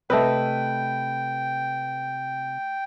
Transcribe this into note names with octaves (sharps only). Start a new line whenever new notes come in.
C3 A3 B4 D#5 E5 G5